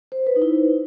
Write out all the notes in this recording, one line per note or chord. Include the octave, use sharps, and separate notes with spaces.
C5
B4
D#4
E4